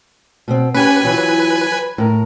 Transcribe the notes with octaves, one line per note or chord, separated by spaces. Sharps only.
B2 B3 C4
C#4 G4 B4 G#5
E3 F#3 F4
A2 A#4